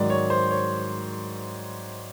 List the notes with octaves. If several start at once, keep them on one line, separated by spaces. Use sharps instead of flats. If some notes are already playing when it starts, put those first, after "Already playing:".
Already playing: G#2 D#3 F#3 D5
C#5
C5
C#5